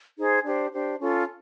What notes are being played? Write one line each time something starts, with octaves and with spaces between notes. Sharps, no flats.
D#4 G#4 C5
D4 G4 C5
D4 G4 C5
C#4 F4 A4